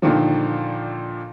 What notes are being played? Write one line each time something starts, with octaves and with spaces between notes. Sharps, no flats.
A#2 D3 D#3 F3